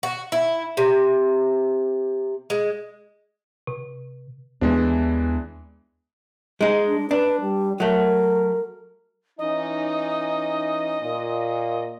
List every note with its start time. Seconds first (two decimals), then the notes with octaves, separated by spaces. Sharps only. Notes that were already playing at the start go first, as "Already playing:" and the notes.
0.03 F#4
0.32 E4
0.77 C3
2.50 G#3
3.67 C3
4.61 D#2 E3 G#3 B3 D4
6.61 G#3 D#4
6.87 D4
7.11 D4 B4
7.41 G3
7.80 F#3 A3 A#4
9.39 E3 C#4 D#4 D#5
11.01 A#2